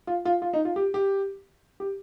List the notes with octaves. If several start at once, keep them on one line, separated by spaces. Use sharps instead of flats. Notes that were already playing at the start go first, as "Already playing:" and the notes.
F4
F4
F4
D#4
F4
G4
G4
G4